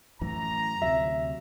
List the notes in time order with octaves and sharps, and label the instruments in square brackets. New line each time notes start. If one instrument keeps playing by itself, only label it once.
[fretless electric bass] F#2 A2 E3 [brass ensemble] A#5
[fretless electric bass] D2 C3 F#3 [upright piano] E5